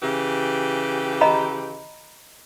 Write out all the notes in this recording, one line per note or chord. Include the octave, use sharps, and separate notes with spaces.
C#3 E3 G4
D#5 A#5 B5